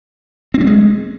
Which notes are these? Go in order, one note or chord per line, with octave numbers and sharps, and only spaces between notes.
C4
G3
G#3